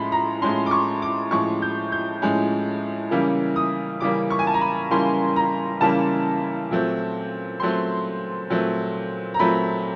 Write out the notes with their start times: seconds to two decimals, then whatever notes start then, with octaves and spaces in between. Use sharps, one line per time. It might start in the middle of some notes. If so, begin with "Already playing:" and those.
Already playing: A2 F3 G#3 C#4 B5 C6
0.12 A#5
0.42 A2 F3 G#3 C#4 C6
0.66 D6
0.71 C#6
1.02 D6
1.31 A2 F3 G#3 C#4 C#6
1.62 G6
1.92 G6
2.22 A2 F3 G#3 C#4
3.11 C#3 E3 G3 A#3 C#4
3.56 D#6
4.00 C#3 E3 G3 A#3 C#4 D6
4.30 C#6
4.39 G#5
4.47 A5
4.54 A#5
4.61 B5
4.91 C#3 E3 G3 A#3 C#4 C6
5.36 A#5
5.80 C#3 E3 G3 A#3 C#4 A5
6.71 A#2 F#3 A3 C4
7.60 A#2 F#3 A3 C4 C6
8.50 A#2 F#3 A3 C4
9.34 A#5
9.39 A#2 F#3 A3 C4 B5